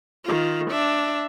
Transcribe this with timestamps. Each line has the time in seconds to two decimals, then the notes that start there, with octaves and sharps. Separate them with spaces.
0.25 D#3 F4
0.71 D4 E5